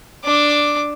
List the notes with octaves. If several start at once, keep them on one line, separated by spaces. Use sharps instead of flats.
D4 D6